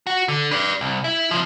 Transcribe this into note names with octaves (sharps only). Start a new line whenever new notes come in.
F#4
D3
B4 D5
C2
E4
C3 F3